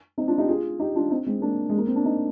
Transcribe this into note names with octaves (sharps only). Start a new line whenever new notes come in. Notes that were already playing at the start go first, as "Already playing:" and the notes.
C4 D#4
D4 F4
D#4 G4
F4 G#4
D#4 G4
D4 F4
C4 D#4
G#3 C4
A#3 D4
G#3
A#3
C4
D4
C4 D#4